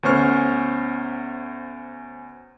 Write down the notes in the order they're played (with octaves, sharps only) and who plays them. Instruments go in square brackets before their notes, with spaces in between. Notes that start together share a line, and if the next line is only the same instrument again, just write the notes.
[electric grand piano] D2 B3 C#4 C5 C#6 F6